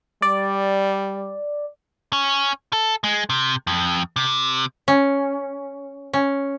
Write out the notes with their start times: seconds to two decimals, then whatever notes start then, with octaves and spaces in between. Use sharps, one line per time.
0.22 G3 D5
2.13 C#4
2.73 A4
3.04 G#3
3.30 C3
3.67 F2
4.16 C3
4.88 C#4
6.13 C#4